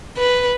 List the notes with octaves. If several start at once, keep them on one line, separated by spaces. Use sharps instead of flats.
B4